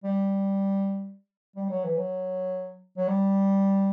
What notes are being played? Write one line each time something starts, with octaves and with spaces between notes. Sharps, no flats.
G3
G3
F#3
E3
F#3
F#3
G3